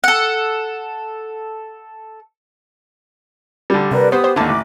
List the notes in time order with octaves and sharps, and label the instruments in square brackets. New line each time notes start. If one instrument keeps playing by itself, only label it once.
[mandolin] A4 F#5
[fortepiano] D3 G3
[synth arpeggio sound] C3 [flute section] A#4 B4 D5
[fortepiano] B3 [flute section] G4 D#6 [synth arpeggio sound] C5
[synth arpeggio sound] C5
[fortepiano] D#2 D3 [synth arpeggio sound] E4 A5 [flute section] D6
[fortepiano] A1